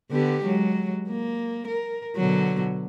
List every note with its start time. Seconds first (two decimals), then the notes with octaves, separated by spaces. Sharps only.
0.11 D3 B3 G4
0.44 F#3 G#3
1.08 A#3
1.67 A#4
2.16 B2 D3 F#3